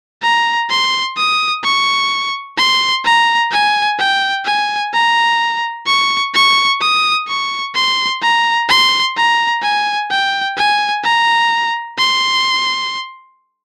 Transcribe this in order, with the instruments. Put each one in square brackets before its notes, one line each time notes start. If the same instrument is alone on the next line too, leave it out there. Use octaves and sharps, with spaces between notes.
[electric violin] A#5
C6
D#6
C#6
C6
A#5
G#5
G5
G#5
A#5
C#6
C#6
D#6
C#6
C6
A#5
C6
A#5
G#5
G5
G#5
A#5
C6